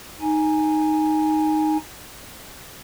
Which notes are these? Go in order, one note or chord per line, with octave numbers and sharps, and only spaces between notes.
D#4 G#5